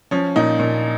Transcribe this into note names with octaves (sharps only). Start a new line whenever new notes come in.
F3 C#4
A#2 D#4
A#2